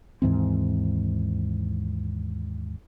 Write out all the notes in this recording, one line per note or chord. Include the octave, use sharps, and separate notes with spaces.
D#2 G#2 E3 C4